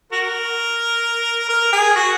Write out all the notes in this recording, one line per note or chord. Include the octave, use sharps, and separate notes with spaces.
F#4 A#4
A#4
G#4
F#4